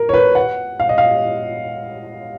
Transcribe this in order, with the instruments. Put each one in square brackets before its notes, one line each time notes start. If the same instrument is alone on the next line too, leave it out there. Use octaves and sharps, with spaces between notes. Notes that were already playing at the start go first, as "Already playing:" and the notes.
Already playing: [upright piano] A#4
C#5
B4
F#5
F5
D#5
F5